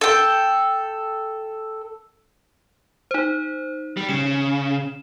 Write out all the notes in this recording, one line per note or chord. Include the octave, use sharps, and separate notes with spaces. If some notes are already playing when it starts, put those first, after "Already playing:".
A4 G5
D#4 C5
G3
C#3 E7